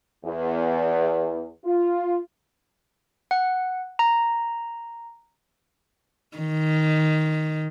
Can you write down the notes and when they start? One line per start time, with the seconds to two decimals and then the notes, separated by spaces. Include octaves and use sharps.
0.25 E2
1.65 F4
3.31 F#5
3.99 A#5
6.38 D#3